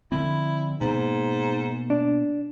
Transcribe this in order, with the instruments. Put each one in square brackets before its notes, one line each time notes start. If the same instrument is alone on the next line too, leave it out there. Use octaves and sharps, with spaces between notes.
[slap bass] D3 F3 C4 [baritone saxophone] E4
[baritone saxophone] G#2 [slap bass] B2 A#3
[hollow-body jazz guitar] D4